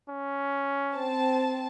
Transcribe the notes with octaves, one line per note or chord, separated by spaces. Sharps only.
C#4
C4 A5